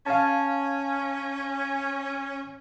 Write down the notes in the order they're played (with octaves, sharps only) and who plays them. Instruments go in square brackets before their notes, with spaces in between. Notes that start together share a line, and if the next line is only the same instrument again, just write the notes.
[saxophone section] C#4 [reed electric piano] F5 A5